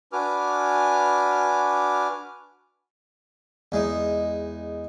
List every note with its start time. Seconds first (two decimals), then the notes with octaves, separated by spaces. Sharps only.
0.13 D4 F#4 B4 G#5 D6 F6
3.72 E2 G#3 D#4